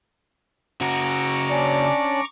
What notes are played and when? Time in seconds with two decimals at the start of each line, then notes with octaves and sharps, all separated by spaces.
0.81 C#3 F#4 A#5 C#6 D6
1.50 C#4 D4 D5